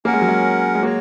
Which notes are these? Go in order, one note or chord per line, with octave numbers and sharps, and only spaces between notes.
A#3 C#4 A#4 F#5
G#3
F#3
G#3
G#3
A#3 F#4 C#5